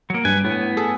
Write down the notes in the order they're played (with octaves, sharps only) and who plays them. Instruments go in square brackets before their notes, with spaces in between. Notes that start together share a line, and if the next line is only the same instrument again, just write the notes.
[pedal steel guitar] F#3 A#3
[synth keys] G2 [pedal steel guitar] B4 G#5
[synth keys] A2 [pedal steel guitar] B3
[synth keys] G#4 A4